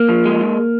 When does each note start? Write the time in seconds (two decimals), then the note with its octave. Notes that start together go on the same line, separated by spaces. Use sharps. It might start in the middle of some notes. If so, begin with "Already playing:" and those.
Already playing: A#3
0.09 F3
0.26 G#3
0.41 G#2